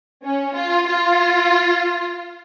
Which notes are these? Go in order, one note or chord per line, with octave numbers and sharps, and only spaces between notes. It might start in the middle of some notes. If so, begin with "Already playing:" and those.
C#4
F4
F4